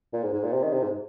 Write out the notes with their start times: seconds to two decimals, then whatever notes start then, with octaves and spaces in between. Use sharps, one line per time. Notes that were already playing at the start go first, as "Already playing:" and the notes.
0.13 A#2
0.23 G#2
0.33 G#2
0.43 A#2
0.53 C3
0.63 D#3
0.73 C3
0.83 G#2